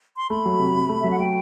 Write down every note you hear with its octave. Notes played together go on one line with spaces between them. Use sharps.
C6
A3 B5
F#3
C3
C3
A3
F#3 E5
F#5
A3 G5